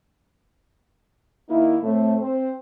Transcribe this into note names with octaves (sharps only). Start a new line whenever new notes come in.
D#3 A#3 D#4 E4
A2 A3 C4
C4 C5